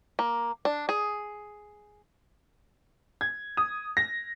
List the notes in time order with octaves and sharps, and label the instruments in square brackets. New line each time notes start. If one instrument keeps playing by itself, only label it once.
[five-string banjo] A#3
D4
G#4
[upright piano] G#6
D#6
A#6